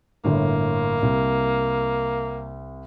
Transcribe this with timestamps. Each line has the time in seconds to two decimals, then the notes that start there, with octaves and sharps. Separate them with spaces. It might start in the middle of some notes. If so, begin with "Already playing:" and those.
0.24 G1 A2 A#3
1.02 C2